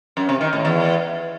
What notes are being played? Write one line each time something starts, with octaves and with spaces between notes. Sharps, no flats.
F#2
C3
D#3
A2
E2